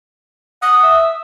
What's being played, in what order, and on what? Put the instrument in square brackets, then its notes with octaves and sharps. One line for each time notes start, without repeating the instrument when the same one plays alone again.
[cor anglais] F#5 [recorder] D#6
[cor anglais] E5